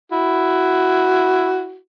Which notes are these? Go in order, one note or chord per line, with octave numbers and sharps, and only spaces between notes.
E4 F#4